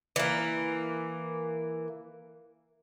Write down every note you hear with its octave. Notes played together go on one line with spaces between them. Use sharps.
E3 A#3